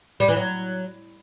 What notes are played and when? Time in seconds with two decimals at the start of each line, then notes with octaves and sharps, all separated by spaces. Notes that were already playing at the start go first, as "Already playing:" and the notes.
0.20 G3
0.28 E3
0.37 F#3